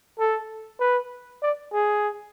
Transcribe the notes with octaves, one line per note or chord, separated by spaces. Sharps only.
A4
B4
D5
G#4